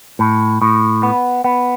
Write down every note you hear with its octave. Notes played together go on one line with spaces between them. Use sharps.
A2
A2
B3
B3